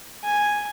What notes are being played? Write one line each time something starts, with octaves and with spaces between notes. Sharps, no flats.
G#5